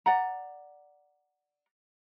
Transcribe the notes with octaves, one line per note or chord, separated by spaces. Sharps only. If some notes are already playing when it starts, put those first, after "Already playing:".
D5 F#5 A#5